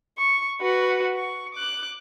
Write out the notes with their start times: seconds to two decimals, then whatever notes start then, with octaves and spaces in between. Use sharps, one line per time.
0.18 C#6
0.61 F#4 B4
1.15 C#6
1.55 D6 F#6